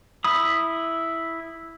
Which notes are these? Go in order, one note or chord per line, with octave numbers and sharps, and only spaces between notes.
E4 B5 D#6